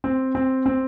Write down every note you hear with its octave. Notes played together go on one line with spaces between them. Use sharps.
C4
C4
C4